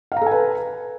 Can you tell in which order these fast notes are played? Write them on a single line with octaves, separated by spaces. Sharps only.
F5 A#5 A4 G#5 B4